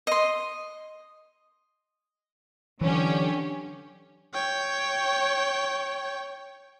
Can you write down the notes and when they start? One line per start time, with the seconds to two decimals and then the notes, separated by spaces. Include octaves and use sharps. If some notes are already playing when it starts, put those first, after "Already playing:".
0.07 D#5 C6
2.81 D3 E3 F#3 C#4 G4
4.34 C#5 G5